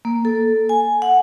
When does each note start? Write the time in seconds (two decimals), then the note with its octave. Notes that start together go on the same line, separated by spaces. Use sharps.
0.05 A#3
0.25 A4
0.69 G#5
1.02 F#5